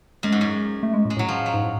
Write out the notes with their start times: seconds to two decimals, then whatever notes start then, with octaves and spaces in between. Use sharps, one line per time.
0.23 F#2 G#3
0.32 G#2
0.41 F#2
0.83 A3
0.94 G#3
1.05 A2
1.10 G#3
1.17 A2 F#3
1.29 F3
1.46 F#3
1.54 G#2
1.64 A2